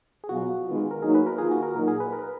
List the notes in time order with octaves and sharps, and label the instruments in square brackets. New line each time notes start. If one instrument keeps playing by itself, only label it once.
[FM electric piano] G#4
[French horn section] B2 F#3 B3 F4 [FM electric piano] F#4
[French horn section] D#3 G#3 B3 F4
[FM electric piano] A#4
[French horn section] F#3 A#3 D#4 [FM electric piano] G#4
[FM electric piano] B4
A#4
[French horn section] D#3 A#3 F4 [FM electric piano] G#4
[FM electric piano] F#4
A#4
[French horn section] A#2 F#3 A#3 D#4 F#4 [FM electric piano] A#4
[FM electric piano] G#4
B4
A#4
B4